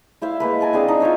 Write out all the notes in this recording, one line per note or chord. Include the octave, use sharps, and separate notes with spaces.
E4 C5 E5 F5
G#3 A#3 B4
A#4 G#5 A5
C4 D4 G#4 F5
D#4
F4 C5 C#5 E5